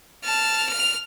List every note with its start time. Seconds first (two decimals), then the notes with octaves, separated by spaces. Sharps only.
0.24 A5 F6
0.70 F6 F7